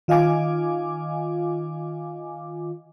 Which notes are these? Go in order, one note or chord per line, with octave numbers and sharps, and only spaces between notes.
D#3 F4 D#5 F5 G#5 D6